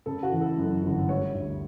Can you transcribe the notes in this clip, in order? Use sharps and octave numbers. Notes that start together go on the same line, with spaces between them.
C#3 A4
F#4
E3
A4
F#2
G1
G3 C#5
D2